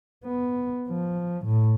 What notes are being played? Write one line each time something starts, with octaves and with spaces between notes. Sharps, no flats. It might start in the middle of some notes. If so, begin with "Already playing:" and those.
B3
F3
A2